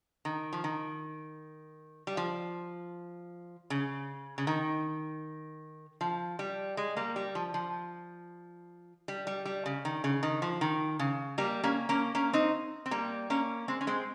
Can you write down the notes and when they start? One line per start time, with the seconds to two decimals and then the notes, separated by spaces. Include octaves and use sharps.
0.25 D#3
0.53 F3
0.64 D#3
2.07 G3
2.17 F3
3.70 C#3
4.38 C#3
4.47 D#3
6.01 F3
6.39 G3
6.77 G#3
6.97 G3 A#3
7.16 G3
7.35 F3
7.54 F3
9.08 G3
9.27 G3
9.45 G3
9.66 C#3
9.85 D#3
10.04 C#3
10.23 D#3
10.42 F3
10.61 D#3
10.99 C#3
11.38 G3 A#3
11.64 A#3 C#4
11.89 A#3 C#4
12.15 A#3 C#4
12.33 C4 D#4
12.86 C4
12.91 G3 A#3
13.30 A#3 C#4
13.68 G#3 C4
13.81 C#4
13.87 G#3 C4